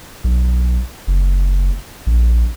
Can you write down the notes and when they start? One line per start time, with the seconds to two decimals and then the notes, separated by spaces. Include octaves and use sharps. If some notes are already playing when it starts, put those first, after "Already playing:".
0.24 B1
1.07 F#1
2.07 A#1